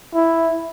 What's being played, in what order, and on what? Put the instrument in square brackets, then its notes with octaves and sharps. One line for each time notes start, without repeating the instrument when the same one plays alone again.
[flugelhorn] E4